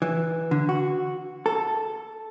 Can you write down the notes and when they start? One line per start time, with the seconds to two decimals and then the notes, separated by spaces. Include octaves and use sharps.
0.02 E3
0.51 D3
0.69 F#4
1.46 A4